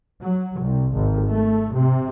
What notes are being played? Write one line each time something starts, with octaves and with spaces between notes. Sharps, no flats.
F#3
C2
G#1
A3
C3